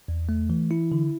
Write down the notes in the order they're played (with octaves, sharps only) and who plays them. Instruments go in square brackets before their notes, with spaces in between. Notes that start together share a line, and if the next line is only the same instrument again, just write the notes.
[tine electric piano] E2
A3
E3
E4
D3